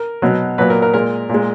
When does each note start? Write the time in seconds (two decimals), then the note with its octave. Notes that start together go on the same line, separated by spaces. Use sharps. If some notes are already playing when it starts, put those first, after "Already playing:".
Already playing: A#4
0.22 B2 F#3
0.58 A#2 F#3 B4
0.70 A#4
0.82 A#4
0.94 A#2 G#3 A#4
1.29 A#2 G#3